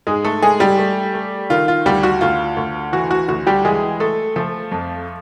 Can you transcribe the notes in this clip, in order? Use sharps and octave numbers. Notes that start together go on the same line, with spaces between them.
G#2 G#3 G#4
A3 A4
G#3 A3 G#4
G3 G4
A3
A3
D#3 F4
F4
D2 G3 G4
F#4
D2 F4
D2
E3 F#4
F#4
D2 F#4
G3 G4
E3 G#3 G#4
A3 A4
F3 A3 A4
F2